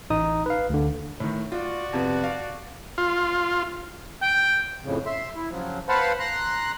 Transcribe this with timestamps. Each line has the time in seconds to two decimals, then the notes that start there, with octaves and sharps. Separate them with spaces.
0.10 A1 D#4 D#6
0.46 B4 F5
0.70 D2 D3
1.20 A2 D#3
1.52 F4 F#4 D5
1.93 F2 C3 B3
2.23 F5
2.98 F4
4.22 G5
4.84 F2 A2 C#3
5.06 E5 C6
5.36 E4
5.50 C#3 F3 F#3
5.89 B4 C5 F5 F#5 A5 B5
6.19 A#5 C6 F#6